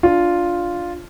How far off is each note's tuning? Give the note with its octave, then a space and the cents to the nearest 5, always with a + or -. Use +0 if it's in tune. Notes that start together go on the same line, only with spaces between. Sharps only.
D4 +0 F4 +0